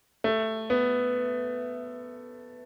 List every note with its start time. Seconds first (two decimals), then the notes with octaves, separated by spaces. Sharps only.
0.24 A3
0.70 B3